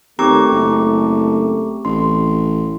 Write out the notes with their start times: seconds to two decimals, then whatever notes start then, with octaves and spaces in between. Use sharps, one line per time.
0.19 D#2 A3 C4 G4 A#5 C#6 D6 E6
0.51 F#1
1.85 A1 C6